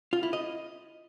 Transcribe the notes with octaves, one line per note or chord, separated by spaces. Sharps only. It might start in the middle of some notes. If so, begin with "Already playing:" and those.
F4
E4
D#5